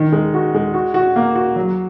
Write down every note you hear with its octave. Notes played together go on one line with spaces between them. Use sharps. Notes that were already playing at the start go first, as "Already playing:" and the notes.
Already playing: D#3 D#4
G#3
F#4
G#3
F#4
F#4
A#3
F#4
F#3